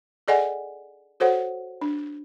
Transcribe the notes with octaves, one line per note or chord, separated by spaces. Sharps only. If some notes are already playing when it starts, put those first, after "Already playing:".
G#4 A4 D5 D#5 F#5 G#5
F#4 A4 C5 C#5 F#5
D4